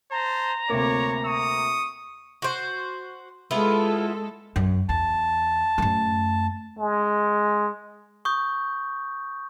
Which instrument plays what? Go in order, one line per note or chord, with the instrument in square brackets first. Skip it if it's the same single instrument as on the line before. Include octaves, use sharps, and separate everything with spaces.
[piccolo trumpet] C5 [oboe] A5 [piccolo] A#5
[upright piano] D2 C3 A#3 [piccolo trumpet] C#5 [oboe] D6
[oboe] C#6 [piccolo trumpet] D#6
[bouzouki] F#4 C5
[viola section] G#3 A4 [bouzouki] B3 E4 F4
[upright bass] F#2
[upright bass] E2 [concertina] A5
[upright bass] F#2 A3
[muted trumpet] G#3
[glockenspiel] C#6 D#6 G6